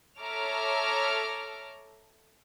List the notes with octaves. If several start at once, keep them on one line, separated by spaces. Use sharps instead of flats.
A4 C#5 E5 A#5 D6 F6